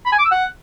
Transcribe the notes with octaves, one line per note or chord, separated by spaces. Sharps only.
B5
G#5
D6
E6
F#5